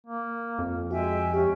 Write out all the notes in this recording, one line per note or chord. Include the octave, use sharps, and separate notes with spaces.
A#3
F2
G#3 F#4 E5 G5 G#5
C#4 G4